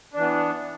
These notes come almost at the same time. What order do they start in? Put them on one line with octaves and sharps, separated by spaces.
D4 E3 B3